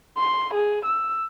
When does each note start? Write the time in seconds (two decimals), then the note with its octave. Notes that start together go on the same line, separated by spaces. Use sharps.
0.17 C6
0.54 G#4
0.85 E6